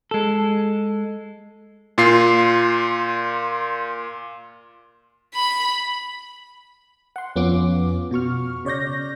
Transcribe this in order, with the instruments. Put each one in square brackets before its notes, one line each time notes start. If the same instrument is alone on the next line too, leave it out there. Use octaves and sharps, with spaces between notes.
[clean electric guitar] G#3 A4
[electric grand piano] A#2 F4 C7
[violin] B5
[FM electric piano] F#5 C6
F2 B3 C#4 F4 D6
B2 F#4 C#6 F6
C#3 C#5 D5 G6 A#6